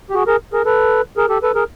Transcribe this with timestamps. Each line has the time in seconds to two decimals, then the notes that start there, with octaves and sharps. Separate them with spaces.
0.10 G4
0.14 F#4 G#4
0.27 G#4 A#4
0.53 G#4 A#4
0.65 A4 B4
1.17 G#4 A#4
1.29 G4 A4
1.43 A4 B4
1.55 G#4 A#4